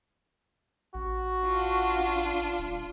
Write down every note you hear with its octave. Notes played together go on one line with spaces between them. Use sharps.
A1 F#4
D4 F4
D#1